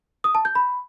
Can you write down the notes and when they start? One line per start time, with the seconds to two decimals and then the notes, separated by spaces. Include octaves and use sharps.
0.24 D#6
0.35 A5
0.45 G6
0.55 B5